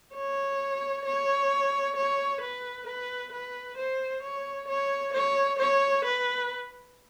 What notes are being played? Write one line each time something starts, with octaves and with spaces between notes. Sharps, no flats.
C#5
C#5
C#5
B4
B4
B4
C5
C#5
C#5
C#5
C#5
B4